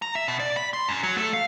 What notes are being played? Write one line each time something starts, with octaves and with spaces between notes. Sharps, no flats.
A#5
E5
B2
D5
B5
C6
F#2
F#3
A3
F5